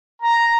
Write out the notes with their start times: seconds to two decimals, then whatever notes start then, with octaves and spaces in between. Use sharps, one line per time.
0.22 A#5